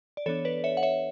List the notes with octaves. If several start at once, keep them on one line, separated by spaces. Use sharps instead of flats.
D5
E3 B3 D4 A4 C#5
B4 D5
C#5 E5
F#5
C#5 E5